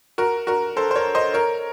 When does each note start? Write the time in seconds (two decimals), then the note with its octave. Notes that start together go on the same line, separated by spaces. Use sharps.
0.18 F#4 A#4
0.47 F#4 A#4
0.77 A4 C5
0.91 C5
0.95 A#4 C#5
1.15 C5 D#5
1.34 A#4 C#5